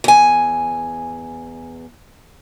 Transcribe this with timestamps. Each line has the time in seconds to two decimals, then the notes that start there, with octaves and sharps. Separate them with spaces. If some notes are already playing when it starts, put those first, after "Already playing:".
0.04 E2 G#5